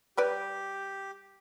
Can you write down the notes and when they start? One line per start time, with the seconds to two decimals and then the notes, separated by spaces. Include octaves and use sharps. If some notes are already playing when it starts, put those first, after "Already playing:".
0.17 G3 G4 B4 D5